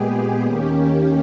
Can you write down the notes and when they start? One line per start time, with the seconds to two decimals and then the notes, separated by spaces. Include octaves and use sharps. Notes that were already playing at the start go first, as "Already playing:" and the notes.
Already playing: A#2 G#3 B3 G4 G#4
0.44 D#2 D#3 A#3 C#4